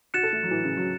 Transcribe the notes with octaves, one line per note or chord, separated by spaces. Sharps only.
F#4 F#6 A6 C#7 E7
A4
A3
F#3
E3
C#3
F#3